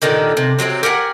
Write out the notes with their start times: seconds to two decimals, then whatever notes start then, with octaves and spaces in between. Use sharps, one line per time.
0.02 A#2 D3 D#3 G4
0.37 C3
0.59 C3 F#3 A3 C4
0.83 G4 A#4 F#5 G#5